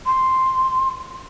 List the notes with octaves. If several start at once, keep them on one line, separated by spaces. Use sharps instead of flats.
C6